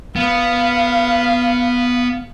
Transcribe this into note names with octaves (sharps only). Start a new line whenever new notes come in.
B3 F5